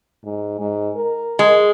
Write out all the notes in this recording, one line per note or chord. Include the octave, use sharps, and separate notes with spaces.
G#2
G#2
A#4
G#3